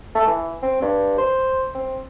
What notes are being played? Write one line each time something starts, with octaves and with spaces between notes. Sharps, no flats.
A3
E3
C4
G2
C5
C4